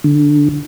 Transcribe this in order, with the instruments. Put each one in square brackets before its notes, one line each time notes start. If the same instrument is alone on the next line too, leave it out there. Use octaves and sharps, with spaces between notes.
[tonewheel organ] D3